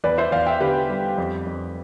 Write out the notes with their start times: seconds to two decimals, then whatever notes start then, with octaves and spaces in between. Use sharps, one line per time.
0.04 E2 B4 D5
0.18 C5 E5
0.32 E2 D5 F5
0.46 E5 G5
0.60 D3 G4 B4
0.89 G3
1.18 F2
1.46 F2